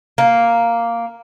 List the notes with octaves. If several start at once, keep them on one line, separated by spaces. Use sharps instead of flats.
A#3